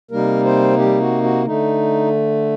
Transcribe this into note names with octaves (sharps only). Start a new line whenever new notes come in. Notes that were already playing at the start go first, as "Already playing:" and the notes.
C3 G3 A#3 D#4 A#4
C4 C5
G3 G4
F#4
F#4
D3 A3 D#4